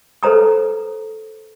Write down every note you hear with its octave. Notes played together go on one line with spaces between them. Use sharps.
A4 B4 C5 A#5 D#6